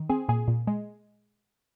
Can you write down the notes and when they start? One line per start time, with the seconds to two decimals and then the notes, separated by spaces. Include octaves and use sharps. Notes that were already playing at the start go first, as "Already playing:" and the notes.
Already playing: D#3
0.10 C4 G#4
0.28 A#2 G#4
0.48 A#2
0.67 G#3